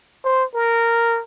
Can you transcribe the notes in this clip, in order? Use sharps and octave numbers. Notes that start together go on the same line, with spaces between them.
C5
A#4